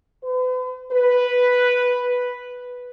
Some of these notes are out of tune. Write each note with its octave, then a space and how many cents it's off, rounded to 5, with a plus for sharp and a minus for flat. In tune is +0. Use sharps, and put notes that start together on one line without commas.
B4 +45
B4 +0